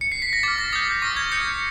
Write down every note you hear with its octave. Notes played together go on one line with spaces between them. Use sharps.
C#7
C7
B6
A#6
D6 F6 A6
A#6
D#6 G6 A6
A#6
C#6 F6 A#6
G#6
D#6 G6 C#7